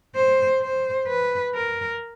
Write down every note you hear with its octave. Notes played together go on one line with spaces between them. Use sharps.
C5
C5
B4
A#4